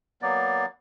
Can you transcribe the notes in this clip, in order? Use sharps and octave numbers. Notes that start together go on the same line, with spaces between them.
F#3 A#3 B3 D5